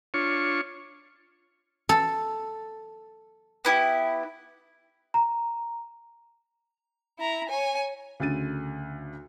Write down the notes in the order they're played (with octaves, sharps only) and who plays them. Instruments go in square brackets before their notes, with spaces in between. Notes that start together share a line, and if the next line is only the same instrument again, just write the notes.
[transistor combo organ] D4 F4 C#5 C#6
[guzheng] A4
[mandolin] B3 E4 G4
[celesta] A#5
[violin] E4 A#5
C#5 G#5
[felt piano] D2 C#3 A6 D#7